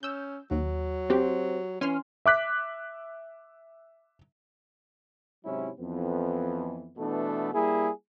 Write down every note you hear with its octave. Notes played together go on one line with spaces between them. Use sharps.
C#4 E6 G6
D#2 F#3
C4 F#4 G4
E3 C#4 G#5 C6 F6
E5 D6 F#6 B6
G#2 C3 F#3 C#4 E4
F2 E3 B3
B2 E3 A3 B3 D4 A4
G3 A#3 E4 G#4